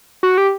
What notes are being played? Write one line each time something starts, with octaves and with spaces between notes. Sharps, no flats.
F#4
G4